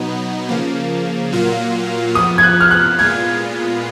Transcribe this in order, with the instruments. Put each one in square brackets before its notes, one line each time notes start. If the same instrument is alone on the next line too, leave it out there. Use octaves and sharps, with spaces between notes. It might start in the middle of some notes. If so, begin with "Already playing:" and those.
Already playing: [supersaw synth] B2 F#3 B3 D#4
C#3 F3 A#3
A#2 F#3 A#3 F4
[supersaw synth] F2 F3 B3 [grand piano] D#6
[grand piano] G#6
F#6
F6
F#6
[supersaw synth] A#2 G#3 B3 F4 [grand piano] G#6